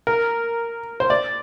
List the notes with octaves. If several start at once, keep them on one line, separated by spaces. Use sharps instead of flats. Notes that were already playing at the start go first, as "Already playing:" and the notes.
A#4
C5
D5